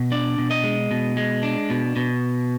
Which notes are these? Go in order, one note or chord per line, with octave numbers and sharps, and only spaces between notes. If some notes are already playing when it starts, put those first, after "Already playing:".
Already playing: B2
D4 D5
B2
D#5
G#3
B2
G#3
D4
B2
B2